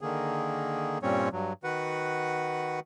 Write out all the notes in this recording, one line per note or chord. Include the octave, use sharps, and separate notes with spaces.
D3 D#3 A#3 G#4
G2 A#2 G3 C4 C#4 C#5
G2 F#3
D#3 F#4 B4 F#5